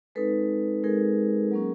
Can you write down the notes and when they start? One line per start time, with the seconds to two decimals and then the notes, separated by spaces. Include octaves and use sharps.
0.15 G#3 C4 D#4 A4 B4
0.83 G#3 C4 D#4 G#4 A#4
1.52 F#3 A#3 C#4